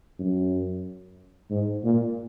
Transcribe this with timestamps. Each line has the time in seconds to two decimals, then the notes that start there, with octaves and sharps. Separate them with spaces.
0.19 F#2
1.50 G#2
1.83 A#2